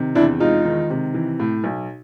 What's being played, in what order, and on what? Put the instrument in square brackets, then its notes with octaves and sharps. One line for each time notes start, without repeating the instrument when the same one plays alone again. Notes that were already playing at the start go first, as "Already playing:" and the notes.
Already playing: [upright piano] C3 D#3
E2 D4 E4
G#3 D#4 F4
D#3
C3
E3
A2
B1